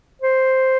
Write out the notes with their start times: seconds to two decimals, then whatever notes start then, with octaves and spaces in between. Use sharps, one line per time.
0.21 C5